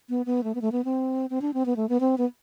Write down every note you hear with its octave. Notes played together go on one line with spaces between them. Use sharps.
B3
B3
A3
B3
A3
B3
C4
C4
D4
C4
B3
A3
B3
C4
B3